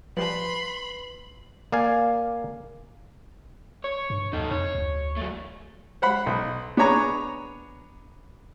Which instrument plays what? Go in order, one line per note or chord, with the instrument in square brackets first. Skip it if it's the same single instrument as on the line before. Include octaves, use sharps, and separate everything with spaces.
[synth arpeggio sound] F3 G3 D4 [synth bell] B4 [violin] B5 C6 [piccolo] F#7
[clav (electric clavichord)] A#3 D5 F5 G#5
[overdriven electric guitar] C#5
[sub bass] G2
[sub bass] D#2 [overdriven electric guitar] D#4 A4
[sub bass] F2 [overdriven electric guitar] C#5
[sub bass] D2
[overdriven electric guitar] F#3 A3
[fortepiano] C5 F#5 B5
B1
B3 D4 G#4 C#5 A#5